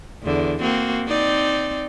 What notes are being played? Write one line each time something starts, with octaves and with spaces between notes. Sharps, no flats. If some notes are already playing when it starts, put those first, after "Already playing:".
E2 D3
A#3 C4 F#4
C4 D#4 D5